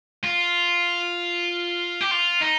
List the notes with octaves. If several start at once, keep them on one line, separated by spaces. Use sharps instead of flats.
F4
G4
F4
D#4